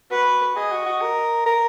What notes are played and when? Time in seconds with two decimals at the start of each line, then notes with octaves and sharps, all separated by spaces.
0.11 F#4 B4
0.56 G#4 D#5
0.71 F#4
0.86 F#4
1.01 A#4
1.46 A#4